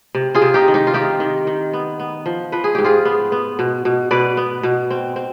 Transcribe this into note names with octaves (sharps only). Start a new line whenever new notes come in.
C3
F4 G#4
C3
D#4 G4
D#3
D#4 G4
F4
C3 D#4 G4
D#3
D#3
B3
B3
F3
F3 B4
G#4
G#2 G4
F4 G#4
B3
B3
B2
B2
B2 B4 D5
B3
B2
C4
C4